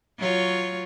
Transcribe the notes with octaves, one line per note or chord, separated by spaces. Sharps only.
F#3 F4 C#5